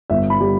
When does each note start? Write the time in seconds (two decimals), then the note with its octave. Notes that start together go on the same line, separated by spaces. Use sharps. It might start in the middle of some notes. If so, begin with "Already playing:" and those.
0.10 G1 E5
0.30 B5
0.40 G3